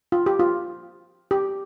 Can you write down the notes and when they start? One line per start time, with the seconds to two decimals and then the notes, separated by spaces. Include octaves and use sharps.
0.12 F4
0.26 G4
0.40 F4
1.31 G4